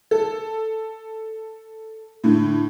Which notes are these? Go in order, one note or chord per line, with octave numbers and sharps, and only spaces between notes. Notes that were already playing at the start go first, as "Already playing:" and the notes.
A4
A2 D3